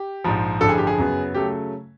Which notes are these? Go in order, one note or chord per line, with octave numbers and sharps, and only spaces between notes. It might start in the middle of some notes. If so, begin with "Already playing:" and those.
Already playing: G4
A#1 G#2 F3
A1 G2 D3 F3 A4
G#4
G4
G#4
F#2 C#3 F#3 B3
C#3 F#3 A3 G4